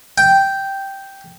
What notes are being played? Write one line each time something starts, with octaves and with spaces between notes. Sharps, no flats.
G5